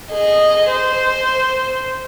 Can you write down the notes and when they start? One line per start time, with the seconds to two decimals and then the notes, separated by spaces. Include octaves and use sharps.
0.11 G#4 D#5
0.71 C5